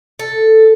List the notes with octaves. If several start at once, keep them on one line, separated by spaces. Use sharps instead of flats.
A4